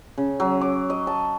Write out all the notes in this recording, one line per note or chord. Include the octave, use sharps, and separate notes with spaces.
C#3
F#3
D6
D#5
A5